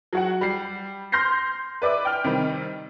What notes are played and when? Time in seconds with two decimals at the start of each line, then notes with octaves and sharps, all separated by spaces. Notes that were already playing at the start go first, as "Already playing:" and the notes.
0.13 F#3 F#4 F#5
0.41 G3 C7
1.12 C6 F6 G6 A#6 C7
1.82 B4 D5 E5 D6
2.05 G5 F6
2.24 C3 D#3 G3